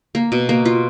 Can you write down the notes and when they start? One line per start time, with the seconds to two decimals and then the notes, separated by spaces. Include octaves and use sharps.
0.15 A#3
0.32 B2
0.49 A#3
0.65 F4